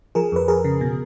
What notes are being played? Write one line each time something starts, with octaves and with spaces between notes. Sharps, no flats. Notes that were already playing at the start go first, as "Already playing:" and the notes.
F3 G#4 A#4
F2 B4
F2 G#4 A#4
C#3
B2